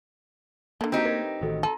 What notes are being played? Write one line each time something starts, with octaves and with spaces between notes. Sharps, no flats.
D3 A3 A#3
C4 D#4 F#4 G4
A#4 B4 G#6
A1 D#3 F#4 A4 D#5
A4 A#5 C6 D#7